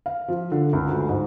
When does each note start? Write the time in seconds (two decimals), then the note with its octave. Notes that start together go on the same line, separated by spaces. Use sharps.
0.06 F5
0.28 F3
0.52 D3
0.73 C#2
0.89 D2
1.09 G#2